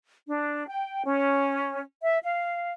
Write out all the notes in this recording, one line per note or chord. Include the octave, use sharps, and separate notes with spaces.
D4
G5
C#4
E5
F5